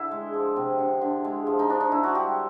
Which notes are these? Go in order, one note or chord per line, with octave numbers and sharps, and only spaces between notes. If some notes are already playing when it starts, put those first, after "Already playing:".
Already playing: D3 E4
G#3
F3
C3
D3
D3
G#3
F3
D#4
F3 D4
D#4
D3 E4
F#4
G3 G4